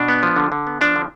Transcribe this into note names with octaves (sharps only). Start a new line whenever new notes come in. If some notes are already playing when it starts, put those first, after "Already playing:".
Already playing: B2 D4
B3
F3
D3
D3
B3
F3 D4
D3